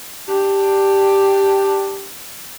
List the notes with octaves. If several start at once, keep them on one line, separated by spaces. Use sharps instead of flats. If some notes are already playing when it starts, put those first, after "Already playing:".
D4 G4